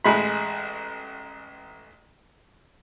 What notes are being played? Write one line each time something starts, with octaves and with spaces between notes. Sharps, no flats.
A1 G#3 B5